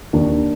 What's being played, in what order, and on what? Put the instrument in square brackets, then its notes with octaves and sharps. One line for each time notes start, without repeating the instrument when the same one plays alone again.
[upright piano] D#2 D4